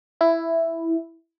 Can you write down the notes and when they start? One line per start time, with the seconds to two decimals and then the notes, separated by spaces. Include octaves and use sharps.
0.21 E4